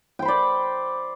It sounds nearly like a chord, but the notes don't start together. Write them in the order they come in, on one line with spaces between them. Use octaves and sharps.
G5 C5 B5 D5